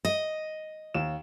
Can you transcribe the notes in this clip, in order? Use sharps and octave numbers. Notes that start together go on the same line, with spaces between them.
D#5
D#2 E7